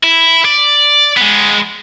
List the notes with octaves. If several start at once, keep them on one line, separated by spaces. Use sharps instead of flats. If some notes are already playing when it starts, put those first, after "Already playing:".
E4
D5
G#3 B3